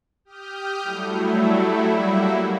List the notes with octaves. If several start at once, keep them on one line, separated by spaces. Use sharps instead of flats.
G4 D#6 F6 G6
F#3 G3 A3 E4
F#3 G3 A#3 E4 F#4